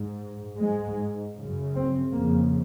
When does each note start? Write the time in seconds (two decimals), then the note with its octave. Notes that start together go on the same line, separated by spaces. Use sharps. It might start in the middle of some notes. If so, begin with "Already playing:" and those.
Already playing: G#2
0.56 G#2 G#3
1.35 F#2 C#3
1.74 C4
2.13 F2 C#3 A#3